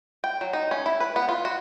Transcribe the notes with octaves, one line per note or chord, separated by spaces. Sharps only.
G5
F#3
D#4
C#4
E4
B4
B3
F4
F#4